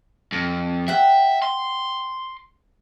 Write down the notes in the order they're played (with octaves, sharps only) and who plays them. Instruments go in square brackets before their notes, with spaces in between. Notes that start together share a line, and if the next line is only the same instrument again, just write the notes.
[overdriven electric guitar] F2
[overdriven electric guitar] E5 [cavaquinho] F#5 G5
[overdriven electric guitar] C6